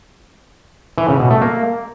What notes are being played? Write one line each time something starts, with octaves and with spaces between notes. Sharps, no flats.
E3
C#3
B2
A3
A#3